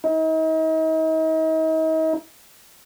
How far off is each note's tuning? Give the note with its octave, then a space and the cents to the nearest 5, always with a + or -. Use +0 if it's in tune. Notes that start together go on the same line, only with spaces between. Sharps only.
D#4 +40